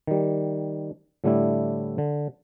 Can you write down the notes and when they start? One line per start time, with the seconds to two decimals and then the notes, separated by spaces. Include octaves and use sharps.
0.07 D#3 G3
1.24 A2 D3 G3 A3 D4 E4
1.98 D3